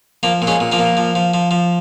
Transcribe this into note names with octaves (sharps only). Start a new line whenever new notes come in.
F3 A#3
A#2
G#3 C#4
A#2
F3 A#3
A#2
F3
F3
F3
F3